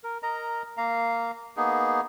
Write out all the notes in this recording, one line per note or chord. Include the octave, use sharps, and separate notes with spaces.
A#4
A#4 D#5 A#5
A#3 F5 A#5
A#3 B3 D#4 G#4